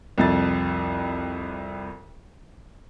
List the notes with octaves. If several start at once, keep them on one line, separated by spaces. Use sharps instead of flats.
C2 F2 A6